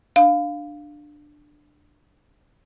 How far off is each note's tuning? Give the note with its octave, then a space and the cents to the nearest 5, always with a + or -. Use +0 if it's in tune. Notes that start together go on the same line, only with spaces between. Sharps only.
D4 +15 F5 +5